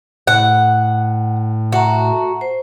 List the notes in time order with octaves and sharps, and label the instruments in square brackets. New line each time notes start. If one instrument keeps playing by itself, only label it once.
[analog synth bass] A2 [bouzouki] F#5
[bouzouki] F#4 [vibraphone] E5 A5 A#5
[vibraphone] C5